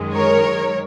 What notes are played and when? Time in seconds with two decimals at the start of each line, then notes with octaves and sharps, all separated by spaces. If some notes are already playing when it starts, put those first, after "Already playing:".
Already playing: F#2 D#3 G#3
0.13 A#4 C#5